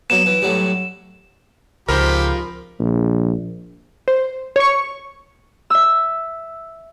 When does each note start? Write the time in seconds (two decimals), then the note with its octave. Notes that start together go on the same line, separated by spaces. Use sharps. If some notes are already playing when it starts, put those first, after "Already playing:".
0.10 F#3 A#3 B3 E7
0.26 E3
0.42 A2 F#3 G3
1.88 C#2 G#2 C3 F3 G4 A#4 B5
2.79 A#1
4.08 C5
4.56 C#5 C#6
5.70 E5 E6